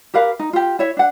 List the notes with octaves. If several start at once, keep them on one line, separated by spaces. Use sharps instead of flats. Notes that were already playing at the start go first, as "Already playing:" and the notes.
G4 A#4 B4 F5
D#4
F4 G4
E4 C#5 E5
D4 F#5